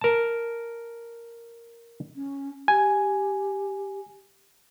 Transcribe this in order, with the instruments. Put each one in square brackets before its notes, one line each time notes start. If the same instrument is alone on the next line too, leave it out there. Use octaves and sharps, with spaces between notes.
[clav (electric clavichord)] A#4 A5
[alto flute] C#4
[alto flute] G4 [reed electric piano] G#5